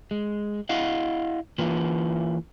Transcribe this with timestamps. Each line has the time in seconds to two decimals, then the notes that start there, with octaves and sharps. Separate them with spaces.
0.11 G#3
0.69 E4 D#5 F5 F#5
1.58 E3 A#3 F4 B4